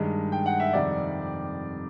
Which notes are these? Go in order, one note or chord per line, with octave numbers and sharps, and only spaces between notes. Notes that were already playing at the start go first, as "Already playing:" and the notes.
Already playing: G2 D#3 G#3
G5
F#5
E5
F2 C3 D#3 G3 D5